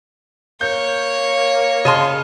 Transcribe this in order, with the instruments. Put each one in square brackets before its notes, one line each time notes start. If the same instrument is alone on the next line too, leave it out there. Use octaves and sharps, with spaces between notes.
[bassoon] A#3 [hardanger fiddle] C#5 [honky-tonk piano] G6
[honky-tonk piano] C#3 [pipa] D#5 A5 C6